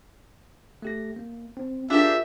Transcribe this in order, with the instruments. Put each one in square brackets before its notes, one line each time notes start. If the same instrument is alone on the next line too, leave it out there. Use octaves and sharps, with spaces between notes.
[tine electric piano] A3 G4 A#6
A#3
C4
[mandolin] D4 G4 [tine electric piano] F4 G#4 A#4 [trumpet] E5